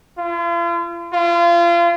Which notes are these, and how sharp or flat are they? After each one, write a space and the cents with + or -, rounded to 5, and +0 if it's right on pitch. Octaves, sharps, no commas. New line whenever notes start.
F4 -40
F4 -30